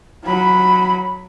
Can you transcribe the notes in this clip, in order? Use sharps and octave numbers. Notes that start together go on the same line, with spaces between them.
F#3 B5